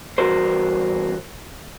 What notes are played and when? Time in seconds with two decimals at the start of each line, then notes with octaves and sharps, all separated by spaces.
0.18 E2 G2 F#4 A#4 C5